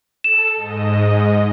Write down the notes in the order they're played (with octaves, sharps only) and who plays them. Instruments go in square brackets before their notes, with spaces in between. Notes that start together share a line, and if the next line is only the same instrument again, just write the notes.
[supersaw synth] A4 [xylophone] E7
[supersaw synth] G#2 D#5